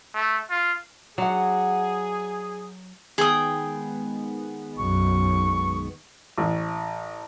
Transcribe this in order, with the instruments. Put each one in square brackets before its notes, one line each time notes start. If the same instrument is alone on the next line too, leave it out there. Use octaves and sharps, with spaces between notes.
[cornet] A3
F4
[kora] F#3 [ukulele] D4 F#5 [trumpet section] G#4
[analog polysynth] D#3 G#3 B3 [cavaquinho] G#4 G5 D#6
[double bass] B1 F#2 [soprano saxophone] C#6
[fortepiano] A1